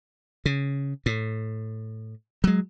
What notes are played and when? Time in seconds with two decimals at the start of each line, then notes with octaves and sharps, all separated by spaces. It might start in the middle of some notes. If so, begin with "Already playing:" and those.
0.46 C#3
1.06 A2
2.44 F#3 G#3